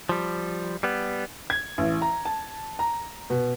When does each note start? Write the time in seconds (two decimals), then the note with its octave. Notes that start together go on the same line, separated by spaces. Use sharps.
0.09 F3 G3
0.83 G3 B3
1.50 G#6
1.78 A1
2.02 A#5
2.25 A5
2.79 A#5
3.30 B2